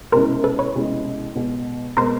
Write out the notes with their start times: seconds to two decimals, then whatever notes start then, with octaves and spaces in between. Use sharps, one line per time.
0.12 C2 B2 G#3 C#4 E4 A#4 C5
0.44 A4 B4
0.59 B4 C#5
0.74 C2 B2 G#3 C#4 E4
1.35 B2 G#3 B3
1.97 B2 G#3 B3 A#4 C5